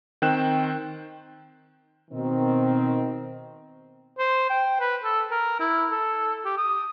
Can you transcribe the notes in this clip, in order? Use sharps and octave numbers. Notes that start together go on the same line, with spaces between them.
D#3 C4 G5 F#6 E7
B2 D#3 C4
C5
G5
B4
A4
A#4
E4
A4
G4
D#6